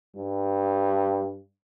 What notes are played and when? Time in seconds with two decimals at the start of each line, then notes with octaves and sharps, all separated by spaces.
0.16 G2